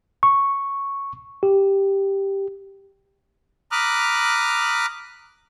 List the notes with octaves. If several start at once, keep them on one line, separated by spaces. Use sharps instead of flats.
C#6
G4
A#5 B5 D6 D#6 F6 F#6